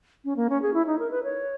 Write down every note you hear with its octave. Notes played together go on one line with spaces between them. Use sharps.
C#4
A#3
C#4
G#4
E4
D#4
A#4
B4
C#5